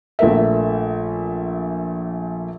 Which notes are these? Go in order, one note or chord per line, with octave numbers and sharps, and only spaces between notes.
A#1 A3 A#4 E5